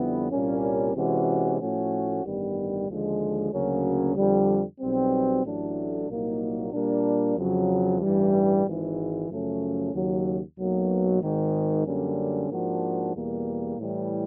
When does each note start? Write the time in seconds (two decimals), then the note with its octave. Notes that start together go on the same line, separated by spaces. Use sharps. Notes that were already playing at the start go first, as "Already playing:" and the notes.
Already playing: F2 D3 G3 B3 E4
0.31 C2 A#2 G3 A#3 C#4
0.94 C3 E3 G#3 C#4 F#4
1.59 A2 F3 A3 C#4 F#4
2.23 A1 G2 D#3 G3 B3
2.87 D#2 D3 F3 G#3
3.51 D2 C#3 F#3 A#3 C#4
4.15 F2 D3 G3
4.80 B1 B2 G3 C4
5.44 A1 A2 F#3 A3 D4
6.08 C2 A#2 F#3 A#3 D#4
6.72 A#2 G3 A#3 D4
7.36 F2 C#3 F#3
8.00 A1 G2 E3 G3
8.65 G#1 G#2 E3
9.29 F#2 C#3 F3 A3 C#4
9.93 D#2 C#3 F#3
10.58 B1 B2 F#3 A#3
11.21 G#1 G#2 D#3
11.85 F#2 D3 G3 A#3 C#4
12.49 G#2 F3 A#3 D4 F#4
13.14 E2 B2 G3 A#3
13.78 A2 E3 G3